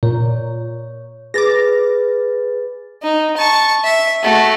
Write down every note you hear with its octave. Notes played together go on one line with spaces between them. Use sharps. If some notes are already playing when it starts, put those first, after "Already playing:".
A#2 C#5
G#4 B4 D6 A6 A#6
D#4
A5 C#6
E5
A3 F#4